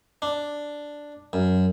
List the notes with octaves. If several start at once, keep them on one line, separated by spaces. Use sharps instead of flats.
D4
F#2